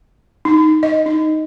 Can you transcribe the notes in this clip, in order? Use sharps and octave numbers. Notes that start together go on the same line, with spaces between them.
D#4
D#5
D#4